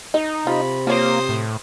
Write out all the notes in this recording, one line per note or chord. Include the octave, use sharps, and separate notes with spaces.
D#4 D#5
C3 F4 B5
A#3 F4 C5 C#5 D#6
A2